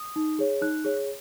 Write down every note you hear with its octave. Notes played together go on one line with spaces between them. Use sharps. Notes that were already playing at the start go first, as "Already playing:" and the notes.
Already playing: D#6
D#4
G#4 C#5
D#4 F#6
G#4 C#5